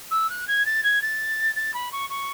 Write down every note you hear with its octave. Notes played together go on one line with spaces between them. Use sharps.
E6
F#6
G#6
A6
G#6
A6
A6
B5
C#6
C#6